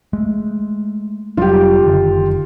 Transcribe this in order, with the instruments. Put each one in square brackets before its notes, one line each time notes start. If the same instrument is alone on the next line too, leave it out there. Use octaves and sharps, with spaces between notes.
[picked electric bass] G#3 A3
[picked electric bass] F1 F#3 G3 [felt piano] F4 G4
[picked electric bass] F#1 D3 D#3